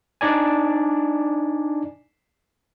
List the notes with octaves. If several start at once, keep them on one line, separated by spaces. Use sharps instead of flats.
D4 D#4 D5 G#5